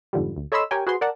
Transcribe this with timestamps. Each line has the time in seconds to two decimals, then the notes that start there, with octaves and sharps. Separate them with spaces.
0.13 F2 G#2 D3 F3 G3
0.36 D2
0.52 A4 C#5 D#5 B5 C6 E6
0.71 G4 A#4 C#5 G5 G#5
0.87 F#4 G#4 B4 C5 C6
1.01 A#4 D5 F#5 A5